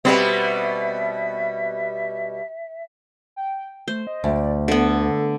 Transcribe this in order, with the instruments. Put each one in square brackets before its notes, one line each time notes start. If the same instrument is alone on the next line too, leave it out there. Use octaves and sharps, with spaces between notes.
[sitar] B2 G3 B3 [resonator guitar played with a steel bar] C4 B4 [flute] E5
[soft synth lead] G5
[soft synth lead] A3 [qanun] C5
[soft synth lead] D#5
[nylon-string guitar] D2 [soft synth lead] D5
[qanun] D3 B3 [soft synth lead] A4